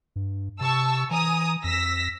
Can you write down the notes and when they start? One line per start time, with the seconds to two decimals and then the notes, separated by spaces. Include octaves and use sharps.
0.16 G2
0.61 C3 A5 C#6 E6
1.11 E3 G#5 A#5 D#6
1.64 F2 E6 A#6 B6